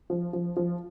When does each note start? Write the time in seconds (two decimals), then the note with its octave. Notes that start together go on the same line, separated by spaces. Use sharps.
0.10 F3
0.33 F3
0.56 F3